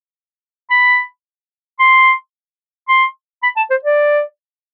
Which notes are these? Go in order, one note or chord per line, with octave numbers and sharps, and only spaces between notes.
B5
C6
C6
B5
A5
C5
D5